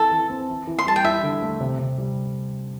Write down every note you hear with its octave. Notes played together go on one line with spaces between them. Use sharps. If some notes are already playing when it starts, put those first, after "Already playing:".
Already playing: E3 C4 A4
E3
C4
E3
E3
C6
G3 A5
G5
E4 E5
D3
A3
C3
C3
G3